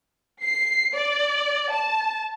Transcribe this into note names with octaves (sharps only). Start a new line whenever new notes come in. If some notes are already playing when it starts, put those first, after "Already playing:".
C7
D5
A5